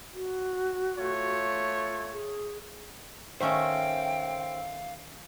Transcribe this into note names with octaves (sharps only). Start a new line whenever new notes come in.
F#4
A3 F4 C#5
G#4
D#3 A3 C#4 C5 E5 F5 G5